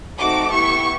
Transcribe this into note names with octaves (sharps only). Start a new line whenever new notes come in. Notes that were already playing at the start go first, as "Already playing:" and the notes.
A3 C4 D#4 F#4 A4 D6
B3 E4 G4 C#6